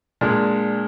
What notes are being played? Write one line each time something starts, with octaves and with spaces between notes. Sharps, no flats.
A#2 G#3 D4